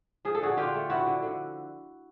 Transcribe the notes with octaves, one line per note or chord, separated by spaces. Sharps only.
F3 G#4
A4
D3 F#4 G#4
D3 F4 G4
A3
F3 E4 F#4
D3
D3